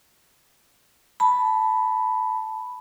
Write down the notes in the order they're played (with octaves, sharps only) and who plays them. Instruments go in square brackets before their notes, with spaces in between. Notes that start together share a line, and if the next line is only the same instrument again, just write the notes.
[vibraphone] A5 B5